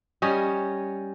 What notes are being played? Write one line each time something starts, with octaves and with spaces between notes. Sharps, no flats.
G3 C#4 C#5 D#5